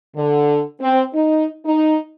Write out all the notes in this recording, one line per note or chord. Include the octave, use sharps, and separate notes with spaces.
D3
C4
D#4
D#4